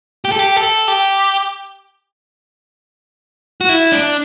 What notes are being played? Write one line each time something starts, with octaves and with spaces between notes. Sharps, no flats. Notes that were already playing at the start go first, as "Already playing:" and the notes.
G4
A4
G4
A4
G4
F#4
E4
D4